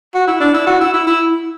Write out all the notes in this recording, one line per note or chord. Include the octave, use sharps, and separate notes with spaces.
F#4
E4
D4
E4
F#4
E4
E4
E4